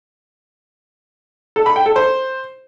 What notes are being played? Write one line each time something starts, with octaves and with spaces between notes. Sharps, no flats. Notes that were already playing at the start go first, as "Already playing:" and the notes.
A4
B5
G5
A4
C5